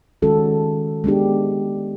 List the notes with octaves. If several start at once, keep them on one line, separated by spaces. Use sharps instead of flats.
D#3 G#3 C#4 F#4 A4
G#3 B3 D4 G4